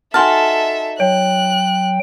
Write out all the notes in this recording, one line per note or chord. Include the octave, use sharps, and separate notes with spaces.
D#4 F#4 A4 E5 G#5 A5 C6 F6
F#3 C#5 G5 F#6